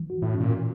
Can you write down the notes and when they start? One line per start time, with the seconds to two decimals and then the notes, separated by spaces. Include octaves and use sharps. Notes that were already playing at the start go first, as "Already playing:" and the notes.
Already playing: E3
0.10 F#4
0.22 A2
0.34 C#4
0.40 A#2